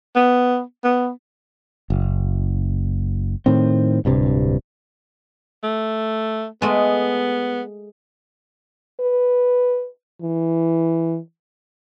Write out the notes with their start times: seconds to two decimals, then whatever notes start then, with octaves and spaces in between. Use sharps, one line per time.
0.16 B3
0.84 B3
1.90 F#1
3.46 A2 D#3 C4
4.05 D1 G2 C3
5.63 A3
6.62 G#3 A3 B3
9.00 B4
10.22 E3